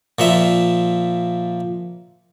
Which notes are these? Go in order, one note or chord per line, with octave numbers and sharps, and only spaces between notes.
A#2 F3 E5